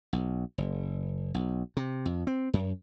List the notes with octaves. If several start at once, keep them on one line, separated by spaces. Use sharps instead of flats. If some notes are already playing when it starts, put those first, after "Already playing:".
B1
F#1
B1
C3
F2
C4
F#2